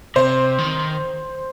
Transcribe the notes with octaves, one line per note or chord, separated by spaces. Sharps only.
C3 C5
D#3